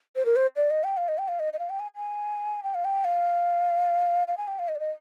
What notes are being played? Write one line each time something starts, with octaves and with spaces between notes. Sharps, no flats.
C5
A#4
C5
D5
D#5
G5
F5
D#5
G5
F5
D#5
D#5
F5
G5
G#5
G#5
G5
F5
G5
F5
F5
G#5
G5
F5
D#5
D5
D#5